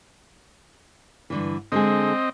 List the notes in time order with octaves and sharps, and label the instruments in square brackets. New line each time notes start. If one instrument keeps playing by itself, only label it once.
[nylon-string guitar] G2 D3 E3
[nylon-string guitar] D3 G#3 G#4 [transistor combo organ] C4 D#5